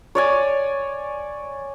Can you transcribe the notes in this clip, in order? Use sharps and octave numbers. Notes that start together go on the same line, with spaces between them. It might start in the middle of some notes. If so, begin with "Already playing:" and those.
C#5 D5 G#5